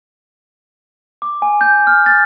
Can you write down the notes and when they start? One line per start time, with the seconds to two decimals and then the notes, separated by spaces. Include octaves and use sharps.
1.22 D6
1.42 G#5
1.61 G6
1.87 F6
2.06 A6